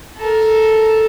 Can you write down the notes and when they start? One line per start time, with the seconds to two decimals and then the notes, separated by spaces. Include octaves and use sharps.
0.17 A4 A#4